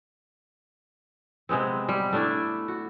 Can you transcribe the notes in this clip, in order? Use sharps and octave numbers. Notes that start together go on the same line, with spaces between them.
C3 G#3 B3 C4
G3
A3 D4 E4
F#4